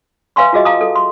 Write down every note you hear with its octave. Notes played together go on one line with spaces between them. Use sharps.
B4 E5 F5 G#5 C6 C#6
F4 F#4 G#4 D#5 E5
F5 A5 A#5 D6 D#6
A4
C6